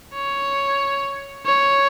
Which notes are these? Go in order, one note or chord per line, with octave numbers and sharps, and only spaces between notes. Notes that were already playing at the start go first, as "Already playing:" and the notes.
C#5
C#5